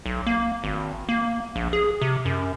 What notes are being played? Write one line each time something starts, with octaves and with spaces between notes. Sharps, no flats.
B1
A#3
G#1
A#3
A#1
G#4
C3
F#2